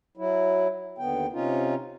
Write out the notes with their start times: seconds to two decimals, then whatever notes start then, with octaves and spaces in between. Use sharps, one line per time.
0.17 F#3 E4
0.98 D#2 D3 B3 G5
1.33 C3 C#4 D#4 F4